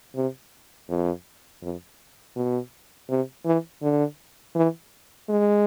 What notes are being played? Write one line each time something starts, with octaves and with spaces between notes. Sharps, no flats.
C3
F2
F2
B2
C3
E3
D3
E3
G#3